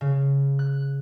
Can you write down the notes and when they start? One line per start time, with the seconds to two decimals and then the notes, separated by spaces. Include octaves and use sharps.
0.01 C#3
0.59 F#6